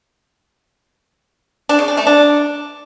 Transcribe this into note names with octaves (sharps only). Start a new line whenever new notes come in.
D4
C#3
D4
A3
D4